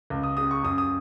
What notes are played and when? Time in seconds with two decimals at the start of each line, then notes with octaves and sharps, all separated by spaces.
0.10 C#2
0.24 D#6
0.37 C#3 D#6
0.51 C#6
0.63 F#2 D#6
0.78 D#6